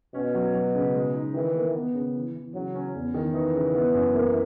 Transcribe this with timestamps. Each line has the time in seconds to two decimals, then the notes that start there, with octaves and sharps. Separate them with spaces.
0.14 B2 C#4
0.35 F#3
0.54 F#3
0.75 C#3
0.95 G#3
1.14 D#4
1.34 D#3 E3
1.54 A#3
1.74 B3
1.94 C#3
2.14 E3
2.34 E3
2.54 C#3 F#3
2.75 C#4
2.95 E2
3.14 D#3
3.34 E3 D#4
3.54 C#3
3.74 B3
3.94 F#2
4.15 A#3